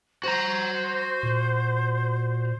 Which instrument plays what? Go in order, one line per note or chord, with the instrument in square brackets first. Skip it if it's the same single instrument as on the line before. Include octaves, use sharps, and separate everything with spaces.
[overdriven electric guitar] F#4 A#5 [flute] C5
[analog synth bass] A#2